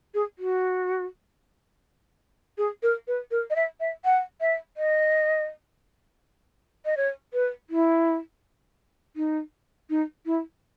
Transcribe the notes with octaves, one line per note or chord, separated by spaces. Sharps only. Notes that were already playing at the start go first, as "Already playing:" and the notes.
G#4
F#4
G#4
A#4
B4
A#4
D#5
E5
E5
F#5
E5
D#5
D#5
C#5
B4
E4
D#4
D#4
E4